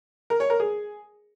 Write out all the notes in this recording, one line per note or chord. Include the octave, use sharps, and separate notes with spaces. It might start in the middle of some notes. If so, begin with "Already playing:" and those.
A#4
C#5
A#4
G#4